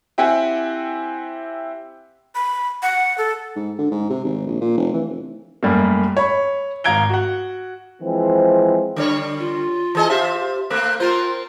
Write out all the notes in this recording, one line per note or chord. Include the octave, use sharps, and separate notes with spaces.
C4 E4 G4 E5 F#5 G#5
B5
F#5
A4
G#2
D3
G#2
C3
G#1
A#1
A#2
F1
E3
F1
F#2 G3 A3 A#3
C#5 B5
G#1 F5 A#5 G#6 D7 G7
F#4 F#5
E3 F3 G#3 C4
D3 G3 C#5
F4
E3 G#4 D#5
F4 G4 C5 E5
A3 A#3 C4 F#6
C4 F4 A#4 C5